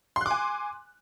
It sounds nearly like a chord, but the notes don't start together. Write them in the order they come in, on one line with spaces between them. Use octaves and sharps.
C6 F#6 D6 G#5